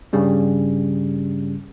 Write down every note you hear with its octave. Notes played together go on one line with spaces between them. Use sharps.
G2 C#3 G3 C#4